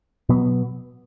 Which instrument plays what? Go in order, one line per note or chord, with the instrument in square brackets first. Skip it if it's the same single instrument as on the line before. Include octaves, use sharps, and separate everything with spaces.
[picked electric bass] B2 F#3 B3